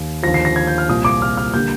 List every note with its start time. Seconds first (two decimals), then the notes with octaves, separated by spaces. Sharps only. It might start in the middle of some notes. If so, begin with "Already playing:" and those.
Already playing: D#2
0.23 D#2 D3 F3 A#6
0.34 C7
0.45 A#6
0.56 G#6
0.67 G6
0.78 F6
0.89 C2 A#2 F3 A#3 D#6
1.05 D6
1.22 F6
1.37 F6
1.54 D3 G3 A#3 G6